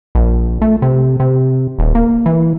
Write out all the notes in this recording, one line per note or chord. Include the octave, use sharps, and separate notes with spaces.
A#1
A3
C3
C3
D#1
A#3
E3